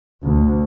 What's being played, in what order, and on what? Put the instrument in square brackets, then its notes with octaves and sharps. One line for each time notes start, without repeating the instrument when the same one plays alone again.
[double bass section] D2